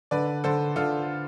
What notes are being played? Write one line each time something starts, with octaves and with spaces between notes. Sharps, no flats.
D3 B4 D5
D3 A4 C5
D3 F4 A4